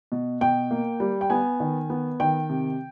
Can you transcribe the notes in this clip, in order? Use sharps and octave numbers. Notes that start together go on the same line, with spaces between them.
B2
B2 G5
A#3
G3
G5
B3 G#5
D#3
B3
D#3 G5
C3